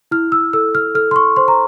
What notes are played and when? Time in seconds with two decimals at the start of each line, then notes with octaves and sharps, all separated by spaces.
0.11 E4 F6
0.32 E6
0.53 A4 E6
0.75 F6
0.95 A4 F6
1.11 C6
1.16 C#6
1.36 C5 C6
1.48 A#5